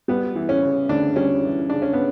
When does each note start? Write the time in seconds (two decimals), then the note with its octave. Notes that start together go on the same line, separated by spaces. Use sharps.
0.08 G3 B3
0.35 E3
0.49 C#4
0.63 C#3
0.89 D2 D4
1.16 G3 C#4
1.43 E3
1.70 C#3 D4
1.82 C#4
1.93 B3